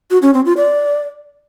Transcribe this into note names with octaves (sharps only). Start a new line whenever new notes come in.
F#4
C#4
C4
F4
D5